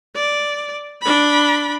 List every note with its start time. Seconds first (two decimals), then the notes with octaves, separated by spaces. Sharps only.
0.15 D5
1.02 D4 B5